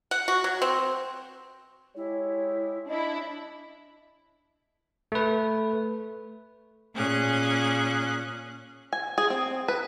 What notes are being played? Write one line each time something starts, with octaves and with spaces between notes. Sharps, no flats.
F#5
F#4
F#3
C4
G#3 E4 G4 C#5
D4 E4 D#5
A3 B4
A#2 C#4 G#4 F#6
G#5
G#4
C4
B4